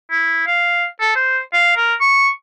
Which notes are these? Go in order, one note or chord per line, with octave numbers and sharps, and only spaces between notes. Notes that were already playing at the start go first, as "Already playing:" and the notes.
E4
F5
A4
C5
F5
A#4
C#6